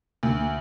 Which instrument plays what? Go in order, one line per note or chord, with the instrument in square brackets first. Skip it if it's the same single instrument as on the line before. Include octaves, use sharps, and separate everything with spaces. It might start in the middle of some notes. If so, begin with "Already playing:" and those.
[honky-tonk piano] D2